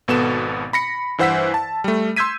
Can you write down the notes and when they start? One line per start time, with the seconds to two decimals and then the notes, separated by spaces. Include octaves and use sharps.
0.08 G#1 B2 B3 A4 E7
0.73 B5 A#6 C#7
1.18 G2 E3 C5 F#5 E6 B6
1.54 A5
1.84 G3 A3
2.16 C6 E6 G6 G#6 B6 D#7